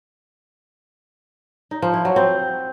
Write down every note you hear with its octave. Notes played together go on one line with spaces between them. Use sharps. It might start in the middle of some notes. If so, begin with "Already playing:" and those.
D#4
F3
E4
F#3
C4